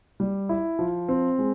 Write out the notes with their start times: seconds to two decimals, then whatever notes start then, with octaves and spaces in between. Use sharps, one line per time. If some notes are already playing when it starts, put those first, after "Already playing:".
0.20 G3
0.49 E4
0.79 F3
1.09 C4
1.39 G#3